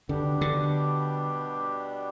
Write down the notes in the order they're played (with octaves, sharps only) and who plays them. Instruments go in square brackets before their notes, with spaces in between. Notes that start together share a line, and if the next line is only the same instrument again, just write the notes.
[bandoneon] B2 G3 B3 D4 G4 [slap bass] D3
[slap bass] D3